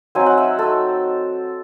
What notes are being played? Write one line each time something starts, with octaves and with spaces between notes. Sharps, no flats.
F#3 C4 D#4 G#5
F#5
E5
A3 D#4 A4